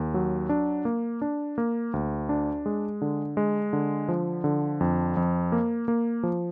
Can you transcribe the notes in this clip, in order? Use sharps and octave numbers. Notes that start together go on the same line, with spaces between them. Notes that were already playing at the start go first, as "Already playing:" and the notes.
Already playing: D#2
F#3
D4
A#3
D4
A#3
D2
D4
G#3
D3
G#3
D3
F3
D3
F2
F2
A#3
A#3
F3